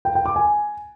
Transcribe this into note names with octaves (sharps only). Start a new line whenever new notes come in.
G5
G5
D6
G#5